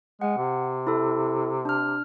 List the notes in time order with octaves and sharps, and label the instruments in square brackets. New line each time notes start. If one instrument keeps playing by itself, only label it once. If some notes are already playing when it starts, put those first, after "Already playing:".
[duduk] G#3 [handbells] F#5
[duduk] C3
[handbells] E4 A4
D4 F6